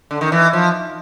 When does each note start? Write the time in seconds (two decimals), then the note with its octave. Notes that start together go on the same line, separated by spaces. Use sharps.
0.11 D3
0.21 D#3
0.32 E3
0.53 F3